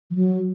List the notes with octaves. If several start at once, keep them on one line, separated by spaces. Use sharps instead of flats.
F3
F#3